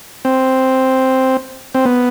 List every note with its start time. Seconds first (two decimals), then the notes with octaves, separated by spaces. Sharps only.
0.25 C4
1.74 C4
1.85 B3